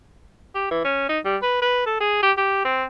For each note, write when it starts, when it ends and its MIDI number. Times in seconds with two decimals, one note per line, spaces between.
0.55 0.68 67
0.71 0.80 52
0.84 1.07 61
1.09 1.19 63
1.25 1.37 55
1.42 1.60 71
1.61 1.85 71
1.86 1.95 69
2.00 2.21 68
2.22 2.32 67
2.37 2.60 67
2.65 2.84 60